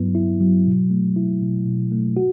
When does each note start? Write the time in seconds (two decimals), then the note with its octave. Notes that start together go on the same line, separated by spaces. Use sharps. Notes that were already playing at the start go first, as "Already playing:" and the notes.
Already playing: G2 F#3 B3 E4
0.15 E4
0.40 F#3
0.66 B2
0.90 A3
1.16 E4
1.42 B2
1.66 B2
1.92 A3
2.17 F#4